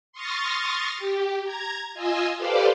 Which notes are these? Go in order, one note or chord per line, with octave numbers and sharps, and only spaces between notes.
C6 C#6 D#6 F6 A6 A#6
G4
A#5 G#6
F4 D#5 G#5 E6
G4 A4 B4 C5 D5 F5